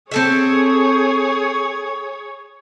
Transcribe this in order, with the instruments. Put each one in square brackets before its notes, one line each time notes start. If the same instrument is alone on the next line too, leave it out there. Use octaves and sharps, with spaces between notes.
[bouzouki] C4 A4 E5 [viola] G#4 C#5